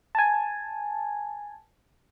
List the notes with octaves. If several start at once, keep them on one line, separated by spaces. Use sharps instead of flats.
G#5 A5